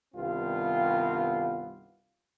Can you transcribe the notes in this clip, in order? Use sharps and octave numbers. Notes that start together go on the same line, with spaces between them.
C2 G2 D#3 B3 C4 F4